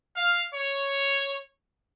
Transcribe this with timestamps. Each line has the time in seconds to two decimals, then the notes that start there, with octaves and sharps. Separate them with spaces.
0.15 F5
0.53 C#5